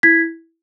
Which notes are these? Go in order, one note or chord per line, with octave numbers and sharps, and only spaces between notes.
E4 G#6 B6